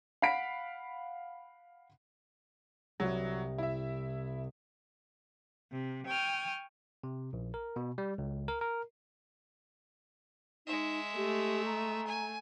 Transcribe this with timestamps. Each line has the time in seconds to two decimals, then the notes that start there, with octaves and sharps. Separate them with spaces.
0.22 F5 F#5 B5 B6 D7
3.00 C2 F#3
3.58 E4 E5
5.72 C3
6.08 G5 G#5 C#6 D#6 F6
7.04 C3
7.33 A#1
7.54 A#4
7.76 B2
7.98 G3
8.18 C#2
8.48 A#4
8.61 A#4
10.67 G#3 D#4 E5
11.17 A3 G4
11.65 A#5
12.07 G#5